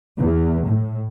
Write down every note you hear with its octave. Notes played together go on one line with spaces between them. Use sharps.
E2
A2